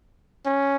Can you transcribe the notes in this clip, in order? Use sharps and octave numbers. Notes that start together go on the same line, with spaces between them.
C#4